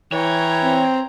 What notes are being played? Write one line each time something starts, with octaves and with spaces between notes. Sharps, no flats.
E3 C#5 G5 A#5
C4